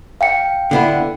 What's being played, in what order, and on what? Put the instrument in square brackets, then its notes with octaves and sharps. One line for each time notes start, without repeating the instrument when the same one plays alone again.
[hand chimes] F5 G5 C#7
[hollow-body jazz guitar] D3 B3 E4